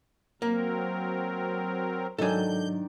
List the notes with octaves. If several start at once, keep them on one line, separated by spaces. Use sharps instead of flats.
F#3 A#3 C4 A#4
G#2 D#3 F#3 D4 A4 G#5 G6